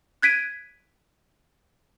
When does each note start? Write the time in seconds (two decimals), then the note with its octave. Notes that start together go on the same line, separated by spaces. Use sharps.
0.22 F#6 G#6 B6 D7 D#7